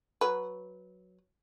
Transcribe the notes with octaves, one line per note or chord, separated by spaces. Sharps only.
F#3 B4